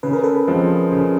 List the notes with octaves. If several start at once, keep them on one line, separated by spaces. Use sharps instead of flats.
C#3 B4
A#4
A4 B4
F3 G#3 C4
C#3